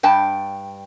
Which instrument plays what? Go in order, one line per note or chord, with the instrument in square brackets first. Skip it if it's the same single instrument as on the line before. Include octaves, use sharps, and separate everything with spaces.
[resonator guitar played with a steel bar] G2 G5 A5